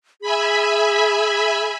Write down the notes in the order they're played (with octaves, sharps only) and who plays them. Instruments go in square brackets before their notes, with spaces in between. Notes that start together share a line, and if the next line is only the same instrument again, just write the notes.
[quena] G#4 [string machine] E5 G#5 B5